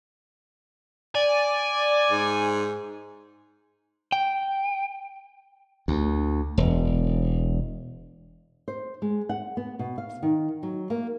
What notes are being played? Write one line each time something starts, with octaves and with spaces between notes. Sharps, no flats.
D5 G#5
G#2
G5
D2
E1
C5
G#3
F#5
B3
B2
F5
D#3
F#3
A#3